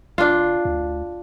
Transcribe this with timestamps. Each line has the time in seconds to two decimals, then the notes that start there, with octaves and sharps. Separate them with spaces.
0.18 F1 D4 F4
0.65 D2